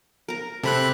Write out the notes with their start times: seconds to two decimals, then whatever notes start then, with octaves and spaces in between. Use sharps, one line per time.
0.28 A#4 A#5
0.63 C3 A4 C5 B5 F#6